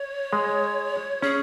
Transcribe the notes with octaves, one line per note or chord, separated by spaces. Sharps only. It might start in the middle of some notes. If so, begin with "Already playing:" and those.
Already playing: C#5
G#3
C#4 G#4